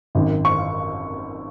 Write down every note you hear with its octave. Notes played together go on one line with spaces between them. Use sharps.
G#1 F#2 D#3
C#6